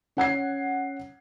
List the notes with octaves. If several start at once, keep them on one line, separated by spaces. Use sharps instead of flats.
C#4 F#5 G#6 C7